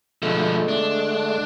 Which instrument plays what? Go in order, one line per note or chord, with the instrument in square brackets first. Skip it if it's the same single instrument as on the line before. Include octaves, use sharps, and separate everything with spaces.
[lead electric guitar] B2 F3 [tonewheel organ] D3 G#3 A3
[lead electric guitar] D4